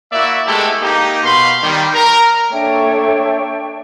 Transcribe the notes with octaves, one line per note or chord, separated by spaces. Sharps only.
A#3 E4 F#4 D5 E5
G#3 A3 B3 E4 G4 A4
A#3 D#4 G4
B2 F5 B5 C6
D#3 G3
A#4
A#3 D4 A4 C#5 E5 G5